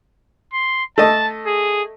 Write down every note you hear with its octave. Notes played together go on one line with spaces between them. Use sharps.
C6
A3 D#5 A5
G#4